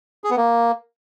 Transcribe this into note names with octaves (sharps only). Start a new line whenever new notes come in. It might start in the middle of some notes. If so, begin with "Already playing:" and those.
G#4
B3
A#3